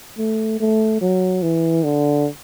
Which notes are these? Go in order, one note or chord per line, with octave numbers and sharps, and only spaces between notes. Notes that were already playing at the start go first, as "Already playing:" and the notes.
A3
A3
F#3
E3
D3